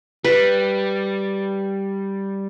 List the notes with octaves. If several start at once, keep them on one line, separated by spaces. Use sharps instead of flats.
G3 B4